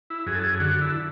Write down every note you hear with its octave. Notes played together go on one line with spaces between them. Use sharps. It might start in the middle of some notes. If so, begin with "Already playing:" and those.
E4
F#2 G#4
A4
G#4
D3 F#4
E4